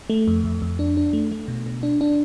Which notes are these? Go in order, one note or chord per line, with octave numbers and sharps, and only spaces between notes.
A3
F2
F2
F2
D4
D4
A3
A3
B2
B2
D4
D4